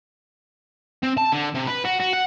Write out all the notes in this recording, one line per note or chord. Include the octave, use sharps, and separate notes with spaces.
C4
A5
D3
C3
B4
F#4
F#4
F#5